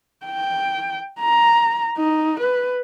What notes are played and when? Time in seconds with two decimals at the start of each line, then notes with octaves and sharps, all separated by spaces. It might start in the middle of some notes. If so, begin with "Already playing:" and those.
0.26 G5
1.20 A#5
1.98 D#4
2.39 B4